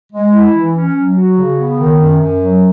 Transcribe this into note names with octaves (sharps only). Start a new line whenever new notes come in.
G#3
E4
E3
C#4
F#3
F#4
C#3
B3
D#3
F#2
F#2
F#3